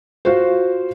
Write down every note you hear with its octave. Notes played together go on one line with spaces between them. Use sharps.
F4 F#4 C5